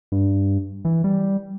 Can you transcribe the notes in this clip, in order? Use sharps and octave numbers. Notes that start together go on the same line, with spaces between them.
G2
E3
G3